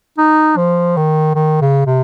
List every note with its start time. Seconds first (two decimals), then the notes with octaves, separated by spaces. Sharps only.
0.18 D#4
0.57 F3
0.97 D#3
1.35 D#3
1.61 C#3
1.86 C3